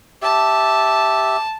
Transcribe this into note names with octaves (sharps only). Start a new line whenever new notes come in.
G4 E5 A5